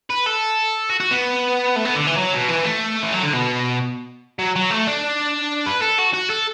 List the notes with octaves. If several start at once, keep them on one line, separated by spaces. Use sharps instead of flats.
B4
A4
F#4
F#4
B3
A3
B3
D3
E3
F#3
B2
E3
A3
E3
F#3
D3
B2
F#3
F#3
A3
D4
B4
A4
F#4
F#4
A4